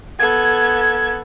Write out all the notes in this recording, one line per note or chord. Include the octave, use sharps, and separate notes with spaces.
B3 A4 G#6